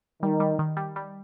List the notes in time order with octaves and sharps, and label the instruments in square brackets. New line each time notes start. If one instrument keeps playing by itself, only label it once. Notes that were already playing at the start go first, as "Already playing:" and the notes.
[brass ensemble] D#3 [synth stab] G3
[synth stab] G3
D#3
G3
G3